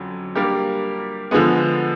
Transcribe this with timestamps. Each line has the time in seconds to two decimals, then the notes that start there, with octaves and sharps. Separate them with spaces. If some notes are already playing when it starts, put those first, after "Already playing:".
Already playing: F2 D3 F#3 C#4
0.35 G3 A#3 D4 G4 A#4
1.31 D3 F3 G#3 B3